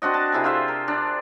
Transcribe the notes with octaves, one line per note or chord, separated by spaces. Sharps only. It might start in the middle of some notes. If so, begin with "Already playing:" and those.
C4 D4 F#4 D#5
A5
C3 E4 A4 G#5
F4 G#4 C5 E5
A#4
D4